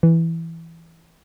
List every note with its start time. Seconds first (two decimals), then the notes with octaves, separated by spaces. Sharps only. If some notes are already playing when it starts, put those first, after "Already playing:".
0.03 E3